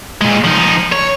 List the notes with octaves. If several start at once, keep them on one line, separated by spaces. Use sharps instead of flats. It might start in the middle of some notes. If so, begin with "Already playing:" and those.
A#2 G#3
F3 D#4
C#5